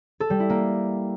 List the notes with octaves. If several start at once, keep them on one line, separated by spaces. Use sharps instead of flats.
A4
G3
E4
A#3